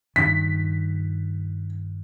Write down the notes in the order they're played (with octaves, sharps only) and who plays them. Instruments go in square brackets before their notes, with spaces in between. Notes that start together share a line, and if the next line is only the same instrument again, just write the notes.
[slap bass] G2 D#3 [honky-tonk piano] B6